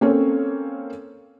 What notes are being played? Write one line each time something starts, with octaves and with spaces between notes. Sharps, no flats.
A#3 C4 C#4 A4 C#5